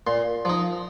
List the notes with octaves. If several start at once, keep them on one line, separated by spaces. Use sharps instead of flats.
A#2 C6
F3 D#4